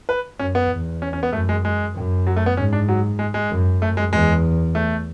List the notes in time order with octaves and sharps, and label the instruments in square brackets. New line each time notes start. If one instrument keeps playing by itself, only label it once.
[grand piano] B4
[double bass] F#2 [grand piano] C#4
[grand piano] B3
[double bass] E2
[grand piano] C#4
C#4
B3
[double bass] F#2 [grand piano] A3
[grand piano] G#3
G#3
[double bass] F#2
[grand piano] F#3
A3
B3
[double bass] G#2 [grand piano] C#4
[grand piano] D4
F#3
G#3
G#3
[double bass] F#2
[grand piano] A3
G#3
[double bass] E2 [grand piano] G#3
[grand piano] A3